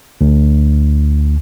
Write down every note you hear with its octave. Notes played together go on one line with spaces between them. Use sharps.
D2